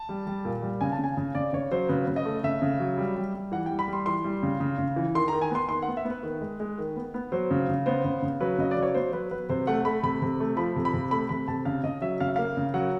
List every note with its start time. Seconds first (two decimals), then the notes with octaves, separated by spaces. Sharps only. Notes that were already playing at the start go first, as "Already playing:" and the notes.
Already playing: A5
0.09 G3
0.27 G3
0.45 A#2
0.62 G3
0.81 C#3 G#5
0.92 A5
0.99 C#3 G#5
1.17 C#3
1.35 C#3 D5
1.53 C#3 C#5
1.71 F#3 C5
1.89 C#3 B4
2.08 C#3
2.16 D#5
2.25 A3
2.43 C#3 E5
2.62 C#3
2.80 F#3
2.97 G3
3.16 G3
3.34 G3
3.52 E3 F#5
3.66 G3 G5
3.79 B5
3.88 G3
3.93 C6
4.06 E3 C6
4.24 G3
4.43 C#3
4.60 C#3
4.78 C#3
4.96 E3
5.15 D#3 C6
5.28 A#5
5.32 D#3
5.42 G#5
5.51 B3 C6
5.69 D#3 C6
5.83 F#5
5.88 B3
5.97 E5
6.05 B3
6.11 B4
6.23 D#3
6.41 G#3
6.60 G#3
6.78 D#3
6.96 B3
7.14 B3
7.32 F#3 C5
7.51 C#3
7.69 C#3
7.86 B3 C5
8.05 C#3
8.22 C#3
8.40 F#3 B4
8.58 C#3 D#5
8.71 D5
8.76 F#3
8.83 C#5
8.94 B3 C5
9.12 F#3 B4
9.31 F#3 B4
9.49 C3 C5
9.67 A3 F#5
9.85 A3 B5
10.03 C3 B5
10.22 C3
10.40 A3
10.57 F3 B5
10.76 C3
10.85 B5
10.93 C3
11.11 A3 B5
11.29 C3 B5
11.48 C3 A5
11.65 C#3 F5
11.83 C#3 D#5
12.02 F#3 E5
12.20 C#3 F5
12.28 E5
12.36 A#3 F5
12.57 C#3
12.74 F#3 F#5